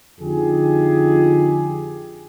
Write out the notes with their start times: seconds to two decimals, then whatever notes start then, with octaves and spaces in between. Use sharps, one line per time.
0.21 F2 D3 D#4 F4 G4 G#4